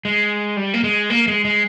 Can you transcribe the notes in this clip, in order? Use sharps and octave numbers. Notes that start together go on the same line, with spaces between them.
G#3
G3
A#3
G#3
A#3
G#3
G#3